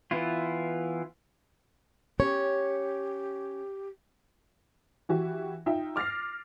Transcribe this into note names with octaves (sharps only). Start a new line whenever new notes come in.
E3 B3 E4 F4
C#4 G4 C#5
E3 F#4 G4
D#4 F4 E5 G5
D6 F6 A6 A#6 C7